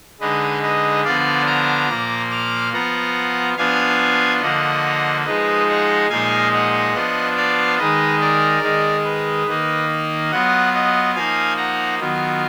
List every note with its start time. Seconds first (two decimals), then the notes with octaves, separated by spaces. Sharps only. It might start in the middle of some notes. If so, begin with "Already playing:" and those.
0.20 D3 G#3 D#4 B4 D#5
0.63 B4 D#5
1.04 D3 F3 B3 D4 F4 D5 F5
1.46 A#5 D6
1.89 A#2 F3 A#3
2.30 D6 F6
2.72 F3 B3 F4 F#5 A#5
3.57 F3 B3 D4 F4 F5 G#5
4.41 D3 F3 A#3 D#5 F#5
5.25 F3 G#3 D#4 B4 D#5
5.68 D#5 F#5
6.10 A#2 F3 G#3 D#4 F5 G#5
6.53 D#5 F#5
6.94 F3 B3 D4 F4
7.36 D5 F5
7.78 D#3 G#3 D#4 B4 D#5
8.21 A#4 D5
8.63 D#3 G#3 D#4
9.05 B4
9.47 D#3 A#3 D#4 B4
10.31 F#3 B3 F4 D#5 F#5
10.73 D#5 F#5
11.15 F3 A#3 D#4 F5 G#5
11.57 F#5 A#5
11.99 D#3 F#3 B3 F4